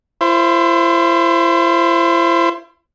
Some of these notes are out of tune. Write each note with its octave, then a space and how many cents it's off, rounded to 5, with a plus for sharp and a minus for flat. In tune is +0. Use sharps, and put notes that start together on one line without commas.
E4 +40 C5 +10